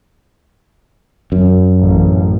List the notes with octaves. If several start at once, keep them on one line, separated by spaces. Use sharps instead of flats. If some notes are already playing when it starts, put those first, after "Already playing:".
F#2
A1